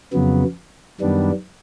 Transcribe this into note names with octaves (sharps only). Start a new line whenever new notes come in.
F2 C#3 F#3 B3
F#2 D#3 G3 B3 D4